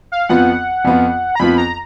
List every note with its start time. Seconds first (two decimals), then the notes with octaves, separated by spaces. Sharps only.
0.12 F5
0.29 F2 F3 B3 F4 F#5
0.85 F2 F3 B3 F4
1.35 A#5
1.39 F2 F3 B3 F4 B5
1.58 A#5